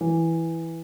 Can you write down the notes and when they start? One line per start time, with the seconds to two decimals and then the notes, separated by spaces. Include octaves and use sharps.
0.01 E3